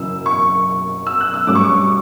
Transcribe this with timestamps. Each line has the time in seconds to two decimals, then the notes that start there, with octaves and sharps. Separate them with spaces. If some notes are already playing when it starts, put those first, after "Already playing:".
Already playing: F#1 F#2 C#3 E3 E6
0.26 C#6
1.07 E6
1.20 F#6
1.34 E6
1.47 G2 F#3 A3 C#4 D6
1.55 C#6
1.64 D6